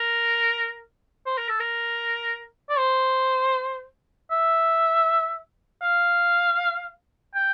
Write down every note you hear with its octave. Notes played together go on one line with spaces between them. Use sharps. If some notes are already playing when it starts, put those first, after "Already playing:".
Already playing: A#4
C5
A#4
A4
A#4
D5
C5
E5
F5
G5